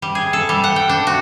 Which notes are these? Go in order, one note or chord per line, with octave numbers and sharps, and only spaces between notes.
G3
G#4
A4
G3
F#5
G5
D4
F#4